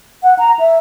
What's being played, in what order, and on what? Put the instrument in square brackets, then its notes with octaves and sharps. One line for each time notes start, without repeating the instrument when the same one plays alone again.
[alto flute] F#5
A#5
E5